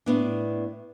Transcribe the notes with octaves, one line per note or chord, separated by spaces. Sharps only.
A2 B3 D4